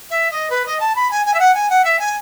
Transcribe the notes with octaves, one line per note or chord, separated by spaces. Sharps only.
E5
D#5
B4
D#5
A5
B5
G#5
G#5
E5
F#5
G#5
F#5
E5
G#5